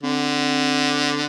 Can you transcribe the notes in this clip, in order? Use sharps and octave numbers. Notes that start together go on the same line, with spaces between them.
D3 C4